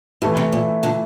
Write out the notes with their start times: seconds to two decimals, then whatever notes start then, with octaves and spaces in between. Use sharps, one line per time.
0.22 A2 E3 A3 E4
0.37 C3
0.52 A#2
0.83 A#2 D3